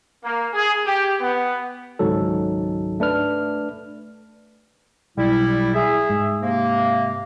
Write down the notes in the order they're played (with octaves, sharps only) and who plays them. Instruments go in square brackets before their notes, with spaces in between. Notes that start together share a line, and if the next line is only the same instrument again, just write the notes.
[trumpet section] A#3
G#4
G4
B3
[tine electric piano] G#1 C#2 G#2 F#3 A4
A3 D4 B4 F6
[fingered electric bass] B1 [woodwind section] G3 E4
[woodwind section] G#4 E5
[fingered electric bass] G#2
[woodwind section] C3 A#3